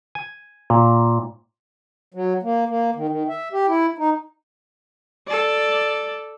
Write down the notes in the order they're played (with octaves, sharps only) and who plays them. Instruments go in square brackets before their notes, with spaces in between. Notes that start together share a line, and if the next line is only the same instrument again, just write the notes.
[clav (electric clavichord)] G#5
A#2
[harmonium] F#3
A#3
A#3
D#3
D#3
E5
G4
E4
D#4
[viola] A4 D5